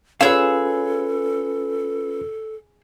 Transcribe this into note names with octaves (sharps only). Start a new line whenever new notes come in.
C#4 F4 G#4 A4 B4 C#5 F5 E6